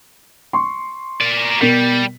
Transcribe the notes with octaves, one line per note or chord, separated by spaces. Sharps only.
C6 C#6
A#4 D5
B2 G3 A#4 B6